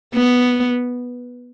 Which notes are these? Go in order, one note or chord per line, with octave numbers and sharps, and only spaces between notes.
B3